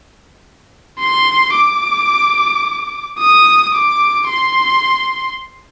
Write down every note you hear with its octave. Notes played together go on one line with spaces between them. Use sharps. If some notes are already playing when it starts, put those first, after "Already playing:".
C6
D6
D#6
D6
C6